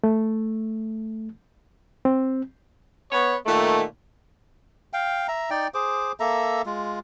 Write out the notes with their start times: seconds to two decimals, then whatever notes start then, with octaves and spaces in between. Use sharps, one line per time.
0.04 A3
2.05 C4
3.12 B3 C#5
3.46 A#2 D#3 A3
4.93 F5 G5
5.28 E5 A#5
5.50 D#4 D5 G5
5.74 G#4 C5 D6
6.20 A#3 A4 E5 A#5
6.66 G#3 F4